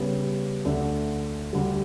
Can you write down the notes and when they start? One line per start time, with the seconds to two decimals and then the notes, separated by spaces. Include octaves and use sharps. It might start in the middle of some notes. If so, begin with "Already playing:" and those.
Already playing: C#3 G3 B3
0.65 D2 D3 A3 D4
1.53 D2 D3 G3